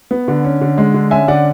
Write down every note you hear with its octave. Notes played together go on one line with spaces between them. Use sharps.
B3
D3
C#4
D3
G#3
D3
C#4 E5 G#5
D3 D5 F#5